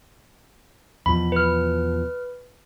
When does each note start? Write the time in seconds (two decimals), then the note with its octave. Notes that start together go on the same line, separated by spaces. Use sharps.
1.06 E2 B2 F3 B5
1.32 B4 F6